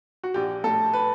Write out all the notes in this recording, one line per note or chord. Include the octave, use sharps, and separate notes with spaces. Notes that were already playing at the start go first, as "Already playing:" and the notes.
F#4
A#1 G4
A2 A4
B4